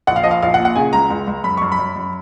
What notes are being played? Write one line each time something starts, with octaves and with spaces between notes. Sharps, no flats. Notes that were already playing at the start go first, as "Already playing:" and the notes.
A#1 F#5
F5
F3 D#5
F5
A#1 F5
F#5
A#2
F#5
C#3 G#5
C#2 A#5
C#2
C#2
F#2 B5
F#2 C#6
B5
F#2
F#2